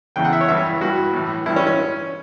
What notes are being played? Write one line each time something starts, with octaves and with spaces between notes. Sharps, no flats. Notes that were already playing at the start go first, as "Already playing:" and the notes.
E2 C#3 E3 G5
F#5
E5
C#5
G2 E3 E5
G2 E3 F#4
A2 E3
G2 E3 E4
C#4
C#4